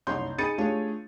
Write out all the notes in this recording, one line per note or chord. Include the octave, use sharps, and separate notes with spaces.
F#1 C2 D#4 C#5 C6 G6
D#4 G#4 B5 A6 C#7 D#7
A3 D4 F4 G4 G#4 C#5